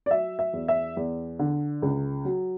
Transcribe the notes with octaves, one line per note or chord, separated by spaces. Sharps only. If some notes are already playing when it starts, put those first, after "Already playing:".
D5
F#3 E5
E5
E2
E5
E2
D3
C#2
F#3